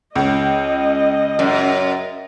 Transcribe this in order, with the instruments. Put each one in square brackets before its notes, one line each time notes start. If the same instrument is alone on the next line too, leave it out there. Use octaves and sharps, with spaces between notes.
[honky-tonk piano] C#2 [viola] D#5
[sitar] F#2